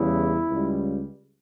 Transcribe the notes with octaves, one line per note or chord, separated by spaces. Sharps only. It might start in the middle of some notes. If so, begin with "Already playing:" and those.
Already playing: E2 C#3 G3 E4
C#2 C#3 G3